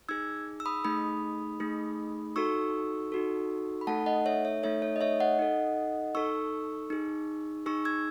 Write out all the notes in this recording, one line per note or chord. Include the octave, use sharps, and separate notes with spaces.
D#4 G#4 E6 G#6
E6
B5 D#6
A3 D#4 G#4 B5 D#6
A3 D#4 G#4
D#4 F#4 A4 C#6 E6
D#4 F#4 A4
B5
A3 D#4 A4 F#5 A5
D#5 F#5
C#5 E5
C#5 E5
A3 D#4 A4 C#5 E5
C#5
D#5
C#5 E5
D#5 F#5
D#4 A4
D#4 A4 C#6 E6
D#4 G#4
D#4 G#4 C#6 E6
E6 G#6